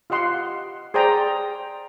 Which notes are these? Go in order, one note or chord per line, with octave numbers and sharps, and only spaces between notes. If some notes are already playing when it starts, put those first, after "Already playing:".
F4 G4 D#5 F#5 C6
G#4 C5 D5 G5 A#5